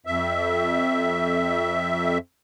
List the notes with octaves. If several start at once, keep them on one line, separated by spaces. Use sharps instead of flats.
F2 E5